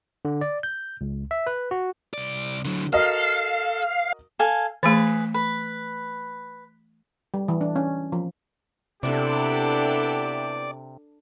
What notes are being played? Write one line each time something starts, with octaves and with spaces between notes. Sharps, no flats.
D3
D5
G6
C#2
E5
B4
F#4
C2 D5
D3 F#3
F#4 A4 A#4 D#5 F5
A4 F5 G#5
E3 A3 G#4 B4
B4
G3
E3
D4
C#4
F3
C3 B3 D4 E4 G4 A4 D5